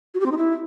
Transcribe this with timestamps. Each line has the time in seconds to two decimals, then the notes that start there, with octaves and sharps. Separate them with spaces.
0.14 F#4
0.20 G4
0.26 C4
0.32 D#4
0.37 E4